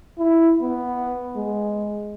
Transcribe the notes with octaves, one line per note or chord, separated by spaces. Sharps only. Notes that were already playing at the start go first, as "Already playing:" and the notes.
E4
B3
G#3